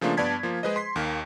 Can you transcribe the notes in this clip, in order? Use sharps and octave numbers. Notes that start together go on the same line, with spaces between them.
C#3 F3 A3 A#3 D4 F4
G2 B3 D5 A5 G#6 B6
F3 A#3 F4
G#3 G#4 B4 C5 D#5
C6 B6 C7
D#2 D#3 A#3